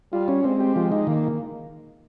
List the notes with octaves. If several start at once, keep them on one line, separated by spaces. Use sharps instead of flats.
G3 F4
C#4
G#3 C4
G4
F3
D#4
D#3 A#3